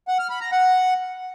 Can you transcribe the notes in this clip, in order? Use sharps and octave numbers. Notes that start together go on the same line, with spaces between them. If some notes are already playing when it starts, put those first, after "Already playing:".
F#5
F6
B5
A#5
F#5